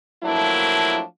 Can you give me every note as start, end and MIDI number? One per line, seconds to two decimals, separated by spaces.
0.23 1.00 53
0.23 1.00 54
0.23 1.00 57
0.23 1.00 58
0.23 1.00 62
0.23 1.00 64